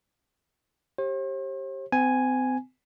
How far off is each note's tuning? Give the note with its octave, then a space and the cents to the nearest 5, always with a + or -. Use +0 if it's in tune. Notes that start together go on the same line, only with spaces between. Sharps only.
G4 -5 C5 +45
C4 -40 G#5 +0